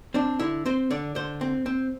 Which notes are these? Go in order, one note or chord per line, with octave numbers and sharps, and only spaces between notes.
C4 D4
D3 E4
C4 C5
D3 D5
D3 C5
C4
C4